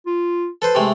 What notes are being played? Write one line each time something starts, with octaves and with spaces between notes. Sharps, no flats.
F4
A4 B4 C5 A5
C3 G#3 A3